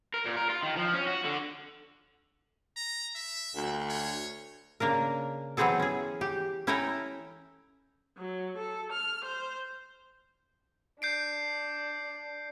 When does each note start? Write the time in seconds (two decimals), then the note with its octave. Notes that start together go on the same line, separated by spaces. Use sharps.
0.14 A#4
0.25 A#2
0.37 A#4
0.49 F4
0.63 D#3
0.76 F3
0.94 C#4
1.07 F#4
1.24 D3
2.76 A#5
3.15 E5
3.56 D2
3.89 C#5
4.80 C#3 A#3 D4 A#4
5.57 E3 F#3 B3 C4 G#4 A4
5.80 C#4 G#4
6.21 G4
6.67 C#4 E4 A4 G5 G#5 A#5
8.17 F#3
8.57 A4
8.92 F6
9.24 C5
11.02 D4 G6 C7 D7